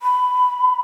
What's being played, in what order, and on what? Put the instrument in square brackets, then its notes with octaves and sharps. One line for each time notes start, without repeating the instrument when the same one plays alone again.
[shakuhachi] B5